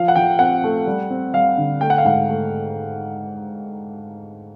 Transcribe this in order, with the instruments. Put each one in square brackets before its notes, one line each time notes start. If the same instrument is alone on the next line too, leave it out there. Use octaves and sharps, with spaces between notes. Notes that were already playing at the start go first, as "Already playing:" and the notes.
Already playing: [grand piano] F3 F5
F#5
F3 G5
C4 F#5
A3
G3
C4
G3 F5
D3
A3 G5
F#5
F5
G#2 F#5
A3